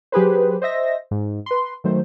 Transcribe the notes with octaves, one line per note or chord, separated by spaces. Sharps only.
F#3 G4 G#4 B4 C5
C5 D#5 E5 A#6
G#2
B4 C6
D#3 F#3 A3 C5